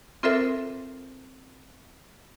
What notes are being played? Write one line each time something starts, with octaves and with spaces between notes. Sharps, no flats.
C4 F4 A4 A#4 C5 E5